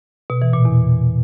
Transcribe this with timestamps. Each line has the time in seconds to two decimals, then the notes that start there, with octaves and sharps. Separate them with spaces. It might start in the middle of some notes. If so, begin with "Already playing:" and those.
0.30 B2
0.42 E3
0.53 A#2
0.65 E2